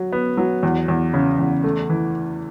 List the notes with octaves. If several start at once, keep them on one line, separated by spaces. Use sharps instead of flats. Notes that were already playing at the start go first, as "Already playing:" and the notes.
Already playing: F#3
B3
F#3
E2
E2
C#3
E2
A3
E3